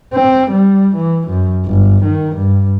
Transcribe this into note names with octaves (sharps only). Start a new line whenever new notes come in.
C4
G3
E3
F#2
G1
D#3
G2